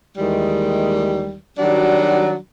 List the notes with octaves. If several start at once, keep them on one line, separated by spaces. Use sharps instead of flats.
D#2 D#3 E3 G3 G#3
D#3 F#3 G3 D4 F#4